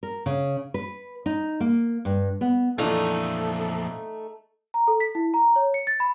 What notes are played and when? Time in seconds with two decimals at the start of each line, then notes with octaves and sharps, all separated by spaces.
0.03 A#4
0.26 C#3
0.74 B4
1.26 D#4
1.60 A#3
2.05 G2
2.41 B3
2.78 F2 A#2 E3 A3 D4 D#4 F4 A4
4.74 A#5
4.88 A4
5.00 B6
5.15 E4
5.34 A#5
5.56 C#5
5.74 C#7
5.87 A6
6.00 B5